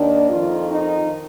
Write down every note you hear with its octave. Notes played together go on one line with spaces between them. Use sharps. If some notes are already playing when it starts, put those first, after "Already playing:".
Already playing: D#2 D#3 D4
F2 D#3 F4
D#4